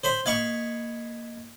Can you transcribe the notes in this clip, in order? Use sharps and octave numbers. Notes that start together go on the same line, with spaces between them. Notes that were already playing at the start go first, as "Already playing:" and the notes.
C5 B5 C6
A#3 D#5 F5 B5 C#6 G#6